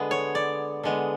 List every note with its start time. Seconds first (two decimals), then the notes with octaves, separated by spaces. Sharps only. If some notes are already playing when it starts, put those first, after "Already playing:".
Already playing: D3 G#3 B3
0.11 C#5
0.35 D5
0.83 D3 G#3 B3